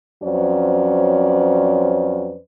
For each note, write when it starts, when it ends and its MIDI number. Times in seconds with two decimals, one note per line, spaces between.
0.23 2.37 41
0.23 2.37 54
0.23 2.37 61
0.23 2.37 71
0.23 2.37 72
0.23 2.37 74